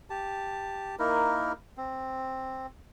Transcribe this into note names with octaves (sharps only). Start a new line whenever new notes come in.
G4 A5
A#3 D#4 E4 A#4
C4